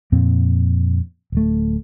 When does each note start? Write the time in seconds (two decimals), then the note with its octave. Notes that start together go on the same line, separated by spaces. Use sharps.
0.12 F2 A#2 C4
1.32 D1 A3